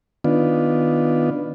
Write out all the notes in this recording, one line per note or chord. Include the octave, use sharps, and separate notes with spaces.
D#3 B3 D4 F4